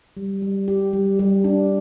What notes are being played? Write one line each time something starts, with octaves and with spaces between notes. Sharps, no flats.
G3
G3
G4
G3
G3
D4